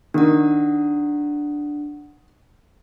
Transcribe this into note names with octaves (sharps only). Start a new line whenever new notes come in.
D#3 D4 F#5